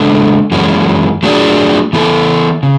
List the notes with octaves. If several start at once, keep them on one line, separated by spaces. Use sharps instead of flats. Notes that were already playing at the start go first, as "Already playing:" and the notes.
Already playing: C#3 G#3 B3 D4 A4
F#2 E3 G#3 C#4
F#3 A3 D4 G#4 D5
E3 B3 E4 A4
C#3